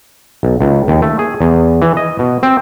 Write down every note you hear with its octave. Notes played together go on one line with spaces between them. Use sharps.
B1
C#2
D#2
A3
G#4
E2
E3
D#5
B2
C4